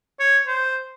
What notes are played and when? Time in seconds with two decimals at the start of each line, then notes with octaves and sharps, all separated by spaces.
0.20 C#5
0.47 C5